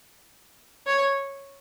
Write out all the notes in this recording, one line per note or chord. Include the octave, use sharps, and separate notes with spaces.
C#5